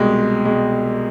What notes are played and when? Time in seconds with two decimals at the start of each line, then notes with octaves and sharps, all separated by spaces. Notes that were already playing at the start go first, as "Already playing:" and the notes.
Already playing: C2 B2 G#3
0.45 B2 G#3